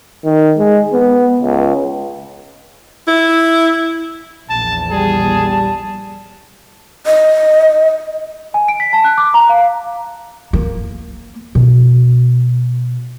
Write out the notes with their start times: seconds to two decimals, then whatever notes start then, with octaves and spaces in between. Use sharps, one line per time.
0.25 D#3
0.58 G#3
0.93 B3
1.42 C#2
3.08 E4
4.50 A#1 E2 A5
4.91 G3 G#4 A5
5.42 G3
7.06 D#5
8.54 G#5
8.68 D7
8.80 B6
8.93 A5
9.04 F#6
9.18 D6
9.34 A#5
9.49 F5
10.53 A#3
11.55 B2